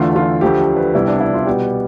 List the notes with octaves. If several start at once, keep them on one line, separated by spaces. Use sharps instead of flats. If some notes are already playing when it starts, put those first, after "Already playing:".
Already playing: E2 D3 A3 F4
F4
D2 D3 F3 A3 G4
G4
B4
C2 C3 G3 B3 E4
D4
E4
F4
B2 G3 B3 G4